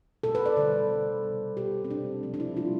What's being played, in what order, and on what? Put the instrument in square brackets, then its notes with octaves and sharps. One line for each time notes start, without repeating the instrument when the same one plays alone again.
[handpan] B2 A3 A4
B4
D5
D3 G3 C5
D3 G3
C3 G3
B2 G3 G4
C4
C3 G3 D4
C3 F3 A3 C4
D4
E4
C3 G3 F4